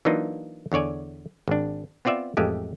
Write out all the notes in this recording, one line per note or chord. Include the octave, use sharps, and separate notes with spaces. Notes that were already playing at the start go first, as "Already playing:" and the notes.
E3 F#3 A#3 D4 D#4 F4
E2 D3 C#5 D5 G#5
G#1 D4
B3 C4 F4 D5 E5
A1 F2 G#3 A3 G4